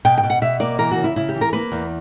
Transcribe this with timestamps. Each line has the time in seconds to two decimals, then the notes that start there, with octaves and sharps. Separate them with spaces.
0.05 B2 G5
0.18 G5
0.23 B2
0.30 F#5
0.42 B2 E5
0.60 A#3 D5
0.79 E3 A#4
0.91 F#4
0.97 C#3
1.04 E4
1.16 C#3 E4
1.29 G4
1.35 E3
1.41 A#4
1.53 A#3 B4
1.72 E2